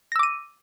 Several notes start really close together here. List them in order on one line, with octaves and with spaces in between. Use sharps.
A#6 E6 D6 D#7